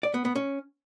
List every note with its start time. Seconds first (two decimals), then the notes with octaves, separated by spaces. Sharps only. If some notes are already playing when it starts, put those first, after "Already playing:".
0.03 D5
0.14 B3
0.25 B3
0.36 C#4